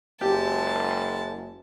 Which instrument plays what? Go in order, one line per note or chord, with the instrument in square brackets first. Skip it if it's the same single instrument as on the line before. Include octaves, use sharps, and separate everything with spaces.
[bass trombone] F#1 [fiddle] G#3 A5 [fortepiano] G4